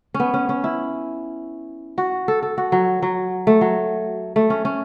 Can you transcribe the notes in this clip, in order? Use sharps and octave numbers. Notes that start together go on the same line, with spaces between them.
C#4
B3
C#4
C#4
E4
F#4
A4
A4
F#4
F#3
F#3
A3
F#3
A3
C#4
C#4